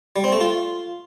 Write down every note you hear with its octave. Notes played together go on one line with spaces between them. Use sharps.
G3
C4
A3
F4